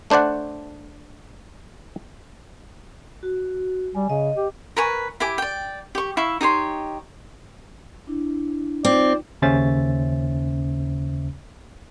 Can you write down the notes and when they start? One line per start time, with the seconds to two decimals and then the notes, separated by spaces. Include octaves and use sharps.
0.10 A3 D4 C5 D5 F#5
3.23 F#4
3.95 G3 G#5
4.10 C#3 D#5
4.36 G4
4.77 A#4 B4 G#5 C#6
5.20 E4 G4 G#5 D6
5.38 D5 G5
5.95 G4 C#6
6.17 E4 E5 F5 C#6
6.41 D#4 G4 C#5 C6
8.07 D4 E4
8.85 C4 D#4 F4 D5
9.42 D#2 C#3 C#4 C5 E5 A6